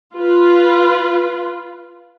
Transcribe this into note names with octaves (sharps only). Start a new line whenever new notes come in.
F4 B4